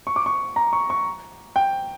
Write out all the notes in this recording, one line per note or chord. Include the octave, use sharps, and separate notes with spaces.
C#6
D6
C#6
A#5
C#6
C#6
G5